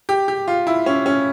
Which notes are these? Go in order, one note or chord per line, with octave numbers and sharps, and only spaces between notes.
G4
G4
F4
E4
C#4
C#4